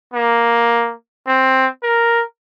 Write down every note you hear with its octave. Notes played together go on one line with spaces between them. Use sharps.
A#3
C4
A#4